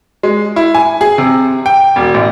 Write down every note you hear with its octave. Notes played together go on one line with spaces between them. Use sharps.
G#3
E4
G#5
G#4
C3
G5
E1
A1